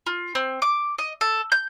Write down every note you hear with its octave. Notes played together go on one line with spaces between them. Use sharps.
F4
C4
D6
D#5
A4
G6